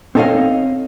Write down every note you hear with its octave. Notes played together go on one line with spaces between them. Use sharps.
C4 D#4 A4 C#5 D#5 F5